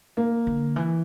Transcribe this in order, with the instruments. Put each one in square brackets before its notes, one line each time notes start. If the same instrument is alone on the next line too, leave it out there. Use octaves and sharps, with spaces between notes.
[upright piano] A#3
[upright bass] D3
E3